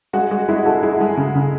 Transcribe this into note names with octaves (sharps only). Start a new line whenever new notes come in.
G#3 F#4
G#3 F#4
G#3 E4 G#4
G#3 F#4 A4
G#3 E4 G#4
G#3
C#3
C#3